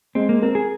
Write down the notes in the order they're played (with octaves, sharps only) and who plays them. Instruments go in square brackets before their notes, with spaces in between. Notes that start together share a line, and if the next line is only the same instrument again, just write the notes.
[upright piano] G#3 [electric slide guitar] C4
[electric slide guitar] A#3
[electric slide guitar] C4 [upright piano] A#4
[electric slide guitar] G#4